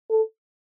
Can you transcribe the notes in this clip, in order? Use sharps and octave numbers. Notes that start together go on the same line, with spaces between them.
A4